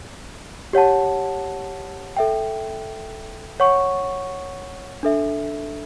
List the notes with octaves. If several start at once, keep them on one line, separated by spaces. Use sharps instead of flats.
G4 C#5 F#5 A5
A4 E5 G5
C#5 F#5 C#6
D4 A4 E5